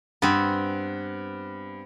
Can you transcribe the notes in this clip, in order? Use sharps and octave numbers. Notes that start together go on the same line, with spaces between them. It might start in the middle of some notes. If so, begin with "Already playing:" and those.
G2 B3 C4